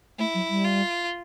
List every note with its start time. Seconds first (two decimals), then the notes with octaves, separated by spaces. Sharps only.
0.19 A3 E4
0.34 F#3
0.50 G3
0.65 F4